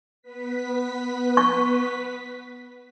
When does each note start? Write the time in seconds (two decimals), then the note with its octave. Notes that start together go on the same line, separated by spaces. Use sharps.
0.22 B3 B4 B6
1.37 C#6